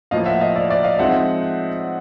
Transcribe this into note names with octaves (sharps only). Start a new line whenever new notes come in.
A2 F3 A#3 D#5 F5
E5 F#5
D#5 F5
D5 E5
D5 E5
D#5 F5
F3 G#3 C4 D#4 E5 F#5